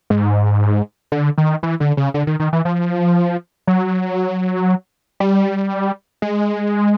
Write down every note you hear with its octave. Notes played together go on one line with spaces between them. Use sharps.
G#2
D3
D#3
E3
D3
C#3
D3
D#3
D#3
E3
F3
F#3
G3
G#3